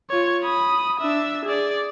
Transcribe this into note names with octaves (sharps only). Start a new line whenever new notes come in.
F4 C#5
B5 D#6
D4 E5
G#4 D5